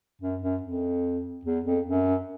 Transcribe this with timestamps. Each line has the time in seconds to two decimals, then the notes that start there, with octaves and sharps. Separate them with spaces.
0.21 F#2
0.42 F#2
0.63 F2
1.45 E2
1.65 F2
1.86 F#2